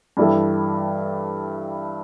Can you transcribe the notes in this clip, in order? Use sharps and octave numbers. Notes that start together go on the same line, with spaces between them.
G2 E3 G3 E4 A4